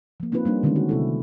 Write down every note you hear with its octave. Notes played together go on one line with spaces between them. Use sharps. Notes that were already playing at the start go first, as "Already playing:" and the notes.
F3 A#3
A#3 C4 D#4 F4 B4
G3 A#3 D4
D3 D#3 G#3 C4 C#4
F#4
C3 E4 A4